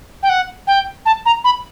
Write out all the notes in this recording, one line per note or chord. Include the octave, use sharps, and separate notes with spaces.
G5
F#5
G5
A5
A#5
B5